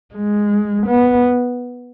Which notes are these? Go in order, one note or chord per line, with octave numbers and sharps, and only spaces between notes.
G#3
B3